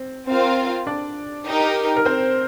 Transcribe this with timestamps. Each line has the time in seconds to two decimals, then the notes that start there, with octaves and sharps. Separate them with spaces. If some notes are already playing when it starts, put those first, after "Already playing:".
Already playing: C4
0.28 C4 F4 A#4 F5
0.87 D4 D5
1.46 D#4 G4 A#4
1.96 A#4
2.05 C4 C5